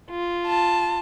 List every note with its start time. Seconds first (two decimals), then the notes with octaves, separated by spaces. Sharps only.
0.12 F4
0.47 A5